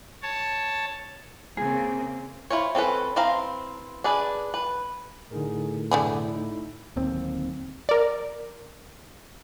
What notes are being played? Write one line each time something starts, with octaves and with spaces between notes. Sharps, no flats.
C#5 A5
C#3 A#3 C4 G#4
E4 F4 C5 C#5
C4 C#4 A4 B4
E3 C4 C5 F5 A#5
D4 G#4 B4
B4
A2 D3 D#4 G#4 A#4
F#2 B2 D3 A3 D4 E4 G#4
D#4
D1 D#2 C4
A#4 D5